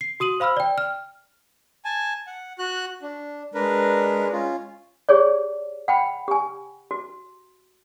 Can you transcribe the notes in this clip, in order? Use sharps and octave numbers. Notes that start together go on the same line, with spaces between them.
C7
F#4 D#6 D#7 F#7
C5 F5 B5 E6 F6
D5 G5
F6
G#5 A5
F#5
F#4 F#6
D4
G#3 D4 A#4 B4
C#4 F4
G4 G#4 C#5 D5
F#5 G5 B5
G4 G#5
F#4